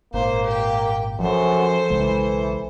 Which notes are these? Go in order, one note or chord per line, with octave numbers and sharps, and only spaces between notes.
G#1 A#2 A#3 C5
G4 G5
F#2 F3 A4 C5
B1 C#3 E3 G#3